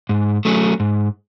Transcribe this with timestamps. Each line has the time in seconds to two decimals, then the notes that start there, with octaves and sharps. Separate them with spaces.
0.09 G#2
0.45 F#3 A3 C#4
0.80 G#2